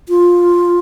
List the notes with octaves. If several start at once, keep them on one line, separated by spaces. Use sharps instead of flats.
F4